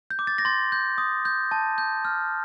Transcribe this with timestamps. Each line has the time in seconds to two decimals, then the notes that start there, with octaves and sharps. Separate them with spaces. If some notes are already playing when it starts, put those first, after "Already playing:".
0.10 G6
0.19 D6
0.27 A6
0.38 A#6
0.45 C6 A6
0.72 G6
0.98 D#6
1.25 G6
1.51 A5
1.78 G6
2.05 F6